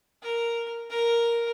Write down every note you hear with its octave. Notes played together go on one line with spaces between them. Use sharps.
A#4
A#4